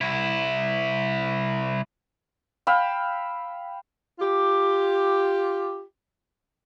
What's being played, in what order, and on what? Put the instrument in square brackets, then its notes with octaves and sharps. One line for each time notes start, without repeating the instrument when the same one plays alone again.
[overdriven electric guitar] C2 E4
[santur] F5 G5 B5 E6
[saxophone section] F4 G4